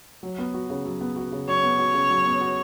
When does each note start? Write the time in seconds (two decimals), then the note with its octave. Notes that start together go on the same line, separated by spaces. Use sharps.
0.23 F#3
0.38 B3
0.54 F#4
0.70 C#3
0.85 F#3
1.01 B3
1.16 F#4
1.32 C#3
1.48 F#3 C#5
1.63 B3
1.79 F#4
1.94 C#3
2.10 F#3
2.26 B3
2.41 F#4